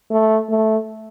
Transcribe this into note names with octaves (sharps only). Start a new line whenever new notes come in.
A3
A3